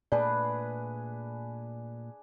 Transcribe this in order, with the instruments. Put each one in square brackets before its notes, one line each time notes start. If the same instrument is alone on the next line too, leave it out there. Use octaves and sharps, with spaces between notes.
[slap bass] A#2 A3 [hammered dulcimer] D4 G#4 B4 [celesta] D5